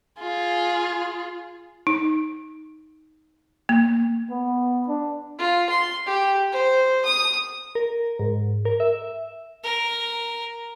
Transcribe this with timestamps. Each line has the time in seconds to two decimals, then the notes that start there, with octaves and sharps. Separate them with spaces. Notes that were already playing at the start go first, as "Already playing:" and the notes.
0.20 F4 G#4
1.87 D#4
3.69 A#3
4.30 B3
4.88 D4
5.39 F4
5.70 C6
6.06 G4
6.52 C5
7.05 D#6
7.75 A#4
8.19 G#2
8.65 A#4
8.80 E5
9.63 A#4